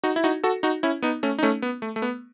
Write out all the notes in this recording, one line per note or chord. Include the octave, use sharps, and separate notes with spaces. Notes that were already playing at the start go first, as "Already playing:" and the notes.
D#4 F#4
E4
D#4 F#4
F#4 A4
D#4 F#4
C#4 E4
B3 D#4
A3 C#4
D#4
A3 C#4
B3
A3
A3
B3